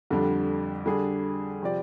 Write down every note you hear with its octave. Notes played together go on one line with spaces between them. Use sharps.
F2 D3 G3 D4
D3 G3 D4 G#4
C3 F3 C4 G4 D5